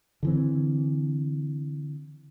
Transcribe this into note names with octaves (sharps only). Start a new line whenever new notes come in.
D3 E3 C4